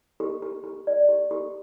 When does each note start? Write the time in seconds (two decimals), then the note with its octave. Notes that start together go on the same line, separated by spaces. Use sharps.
0.20 G4
0.42 G4
0.64 G4
0.87 D5
1.09 G4
1.31 G4